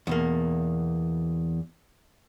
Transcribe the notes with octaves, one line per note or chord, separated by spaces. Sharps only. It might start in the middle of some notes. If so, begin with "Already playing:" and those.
E2 B2 A#3